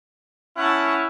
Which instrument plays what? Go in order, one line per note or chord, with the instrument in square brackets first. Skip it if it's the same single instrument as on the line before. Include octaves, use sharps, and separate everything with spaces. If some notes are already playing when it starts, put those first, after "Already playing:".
[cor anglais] C#4 [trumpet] E4 [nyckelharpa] F#5 A5